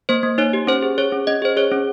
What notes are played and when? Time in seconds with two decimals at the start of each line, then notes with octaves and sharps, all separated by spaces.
0.09 A#3 C5
0.23 A#3
0.38 D#4 C#5
0.53 G4
0.67 C#4 C5
0.82 G#4
0.98 G#4 C#5
1.12 C#4
1.27 C#4 D#5
1.42 G#4 C5
1.57 G#4 C#5
1.72 C#4